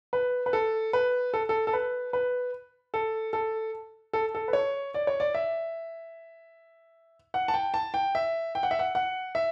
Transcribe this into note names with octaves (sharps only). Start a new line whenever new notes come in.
B4
B4
A4
B4
A4
A4
A4
B4
B4
A4
A4
A4
A4
B4
C#5
D5
C#5
D5
E5
F#5
A5
G5
A5
G5
E5
G5
F#5
E5
F#5
F#5
E5